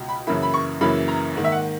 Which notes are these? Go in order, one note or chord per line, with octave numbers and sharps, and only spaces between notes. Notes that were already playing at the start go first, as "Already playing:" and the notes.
Already playing: C#2 B2
B5
F#2 C#3 E3 A#3 E4 B5
B5
C#6
F#2 C#3 E3 A#3 E4 B5
A#5
G#2 D#3 A#3
E5
F#5